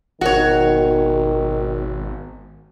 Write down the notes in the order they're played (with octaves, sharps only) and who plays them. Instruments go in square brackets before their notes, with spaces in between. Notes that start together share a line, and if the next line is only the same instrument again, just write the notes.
[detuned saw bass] G#1 [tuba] B2 [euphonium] D#3 [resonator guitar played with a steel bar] F#4 C#5